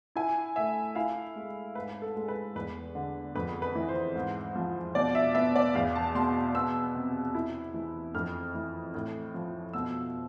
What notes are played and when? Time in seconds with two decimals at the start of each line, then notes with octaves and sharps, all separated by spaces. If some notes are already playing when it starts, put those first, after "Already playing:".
0.16 E4 G#5
0.56 A3 E5
0.95 E4 F5
1.35 G#3
1.75 G#2 B4
2.02 A4
2.16 G#3
2.28 B4
2.55 E2 B4
2.95 D3
3.35 F2 B4
3.62 B4
3.75 E3
3.88 C5
4.16 G#2
4.56 F3
4.95 B2 D5
5.15 E5
5.35 B3 E5
5.56 D5
5.75 E2 F5
5.95 A5
6.15 B2 C6
6.54 B3 E6
6.95 C3
7.35 E4
7.74 E3
8.14 F2 F6
8.55 E3
8.94 A2
9.34 F3
9.73 B2 E6